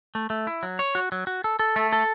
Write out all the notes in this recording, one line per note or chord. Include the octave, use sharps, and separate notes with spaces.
A3
A3
E4
F#3
C#5
F#4
F#3
F#4
A4
A4
A3
A4